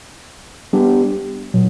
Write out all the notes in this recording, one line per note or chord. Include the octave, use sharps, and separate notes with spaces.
G3 B3 D4 G4
A#2 F#3